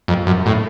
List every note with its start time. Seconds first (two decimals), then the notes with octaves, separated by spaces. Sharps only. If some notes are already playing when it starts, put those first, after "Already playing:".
0.08 F2
0.27 F#2
0.46 A2